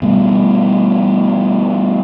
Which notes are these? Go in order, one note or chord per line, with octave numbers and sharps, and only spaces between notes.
B2 G3 A3 B3